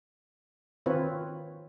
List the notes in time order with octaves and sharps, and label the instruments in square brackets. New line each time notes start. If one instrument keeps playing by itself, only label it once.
[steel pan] D#3 C4 F4 B4 C#5